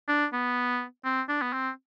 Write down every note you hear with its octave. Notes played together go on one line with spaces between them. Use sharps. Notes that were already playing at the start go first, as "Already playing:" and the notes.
D4
B3
C4
D4
B3
C4